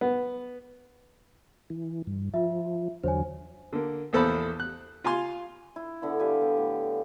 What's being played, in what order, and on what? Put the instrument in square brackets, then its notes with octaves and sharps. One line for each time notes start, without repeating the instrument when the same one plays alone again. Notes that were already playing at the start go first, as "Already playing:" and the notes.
[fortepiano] B3
[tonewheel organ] E3
G2
[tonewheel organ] F3 [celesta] F4 E5
[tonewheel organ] E2 D3 F#3 [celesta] C5 C#5 G#5
[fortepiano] D3 A#3
A#1 E2 A4 C5 A5 B5
F#6
F4 F5 G#5 C6
[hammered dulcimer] E4
D3 B3 E4
G3 G4 F5 G#5
B3
A2